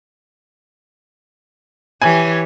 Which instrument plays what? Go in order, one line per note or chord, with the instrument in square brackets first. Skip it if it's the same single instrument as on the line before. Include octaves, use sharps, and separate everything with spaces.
[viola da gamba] E3 G4 C#5 [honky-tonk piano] G#5